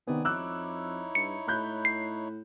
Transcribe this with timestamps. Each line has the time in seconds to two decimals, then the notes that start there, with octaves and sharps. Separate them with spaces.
0.07 C3 D#3 B3 D5 G#5 D#6
0.25 F2 D#4 E4 C#5 D6 E6 F#6
1.15 G2 C#7
1.48 A2 B5 F#6 G6
1.85 C7